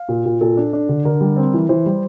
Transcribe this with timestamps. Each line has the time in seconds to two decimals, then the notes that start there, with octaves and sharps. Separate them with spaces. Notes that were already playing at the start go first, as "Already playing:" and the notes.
Already playing: F5
0.09 A#2
0.25 A#2
0.41 A#2 A4
0.57 D4
0.73 D4
0.89 D3
1.05 D3 A#4
1.21 G3
1.37 C4
1.54 E3
1.69 E3 C5
1.86 G3